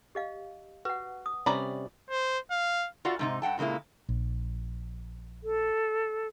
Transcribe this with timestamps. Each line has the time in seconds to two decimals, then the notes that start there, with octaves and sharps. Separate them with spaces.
0.15 G4 D#5 F5
0.85 F#4 B4 F#5
1.26 D#6
1.46 C3 G3 C#4 B4 D5 A#5
2.11 C5
2.51 F5
3.05 F4 F#4 D5 F5 F#5
3.19 G#2 C3 D#4
3.42 G2 F#5 G5 A5
3.58 A#2 C#3 G#3 A#3 E4
4.09 A#1
5.44 A4